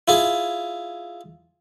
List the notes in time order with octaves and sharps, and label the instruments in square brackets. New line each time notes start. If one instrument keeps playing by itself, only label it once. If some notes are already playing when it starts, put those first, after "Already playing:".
[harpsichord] E4 F4 G#4